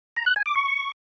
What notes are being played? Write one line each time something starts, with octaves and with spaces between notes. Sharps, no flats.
A#5
F#6
G#5
D6
C#6